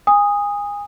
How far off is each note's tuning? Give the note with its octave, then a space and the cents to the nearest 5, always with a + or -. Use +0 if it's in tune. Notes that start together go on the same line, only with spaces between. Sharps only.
G#5 -25 D#6 +0